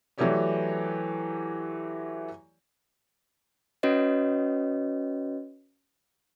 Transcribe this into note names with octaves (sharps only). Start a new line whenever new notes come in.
E3 F#3 A3 G4 C#5 D5
C#4 F#4 B4 C#5 D#5